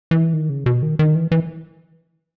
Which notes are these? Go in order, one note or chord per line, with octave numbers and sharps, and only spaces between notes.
E3
D#3
C#3
B2
D#3
D#3
E3
E3